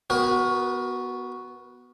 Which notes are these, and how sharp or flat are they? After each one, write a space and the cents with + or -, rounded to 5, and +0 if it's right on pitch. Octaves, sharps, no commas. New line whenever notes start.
B3 +0 F#4 +0 A#4 +30